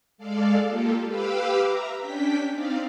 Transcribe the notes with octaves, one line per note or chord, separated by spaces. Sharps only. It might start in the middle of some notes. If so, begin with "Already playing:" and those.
G#3 A4 D5 F5
A#3 F4 G4 A4
G4 B4 F5 B5 D6 E6
E5 A#5
C#4 D4 G5 B6
C4 D#4 D5 F5